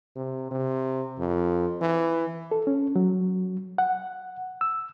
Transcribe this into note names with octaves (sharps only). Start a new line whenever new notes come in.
C3
C3
F2
E3
A4
C#4
F#3
F#5
E6